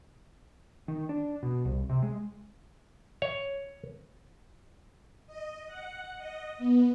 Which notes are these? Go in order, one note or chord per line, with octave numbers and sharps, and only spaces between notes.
D#3
D4
B2
C2
C3
G#3
C#5
D#5
F#5
D#5
B3